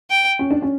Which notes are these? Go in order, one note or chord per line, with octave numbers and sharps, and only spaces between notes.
G5
C#4
D4
C#4